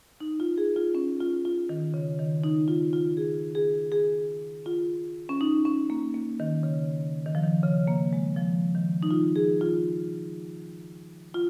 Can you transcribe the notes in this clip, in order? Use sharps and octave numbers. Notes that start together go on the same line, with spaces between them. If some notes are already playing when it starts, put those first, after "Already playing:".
D#4
F4
G#4
F4
C#4
F4
F4
D#3
C#3
D#3
D#4
F4
F4
G#4
G#4
G#4
F4
C#4
D#4
C#4
A#3
A#3
D#3
C#3
D#3
F3
D#3
C#3
A#3
G#3
F3
D#3
D#4
F4
G#4
F4
F4